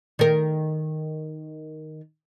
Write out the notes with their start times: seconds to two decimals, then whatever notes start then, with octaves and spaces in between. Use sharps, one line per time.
0.19 D#3 A#4